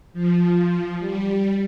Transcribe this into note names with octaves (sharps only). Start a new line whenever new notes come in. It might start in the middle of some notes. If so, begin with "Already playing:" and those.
F3
G3